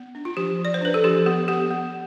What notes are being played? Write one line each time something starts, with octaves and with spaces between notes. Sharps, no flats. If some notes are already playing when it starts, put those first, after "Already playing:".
Already playing: B3
D4
F4
F3 G4
F3
D5
C5
D4 B4
A4
F3 G4
B3 G4
B3 G4
B3